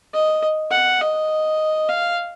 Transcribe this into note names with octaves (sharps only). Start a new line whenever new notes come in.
D#5
F#5
D#5
F5